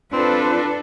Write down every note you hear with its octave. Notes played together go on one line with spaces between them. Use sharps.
C4 D4 F4 A4 B4